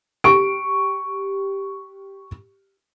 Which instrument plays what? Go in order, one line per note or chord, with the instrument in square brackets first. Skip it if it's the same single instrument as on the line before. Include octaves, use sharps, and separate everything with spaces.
[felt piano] G4 C#6 D7